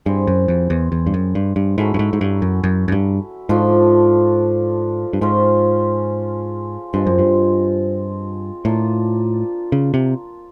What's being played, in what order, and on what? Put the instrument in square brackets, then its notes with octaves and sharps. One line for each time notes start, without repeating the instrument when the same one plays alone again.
[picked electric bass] G2 [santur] C4 E4 G#4
[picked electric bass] F#2
F2
E2
E2
G2
F#2
G2
G2
[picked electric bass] G#2 [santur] F#3 A3 C#4 E4
[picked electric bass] G2
G#2
G#2
G2
F#2
F#2
F#2
G2
[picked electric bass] G#2 [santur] F3 A3 D4 F4
[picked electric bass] G2
[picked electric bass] G#2 [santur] C#4 F4 G#4 C5
[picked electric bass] G2 [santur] F3 G#3 C4 F4
[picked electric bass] F#2
G2
[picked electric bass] A2 [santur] A#3 D4 F4
[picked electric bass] C#3
C3